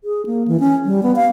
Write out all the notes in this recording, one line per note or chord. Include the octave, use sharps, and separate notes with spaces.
G#4
A#3
E3
C#4
G3
B3
F5